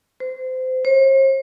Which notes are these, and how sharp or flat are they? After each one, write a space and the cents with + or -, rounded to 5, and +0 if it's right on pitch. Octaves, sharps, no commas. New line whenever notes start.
C5 -25
C5 +45